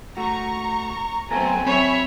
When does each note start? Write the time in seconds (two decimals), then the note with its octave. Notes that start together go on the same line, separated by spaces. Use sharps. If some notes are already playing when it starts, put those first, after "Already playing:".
0.17 A3 F#4 A#5 C#6
1.31 F#3 A3 B3 C4 A4 G#5 A#5
1.66 C4 C#5 E5 B5 C#6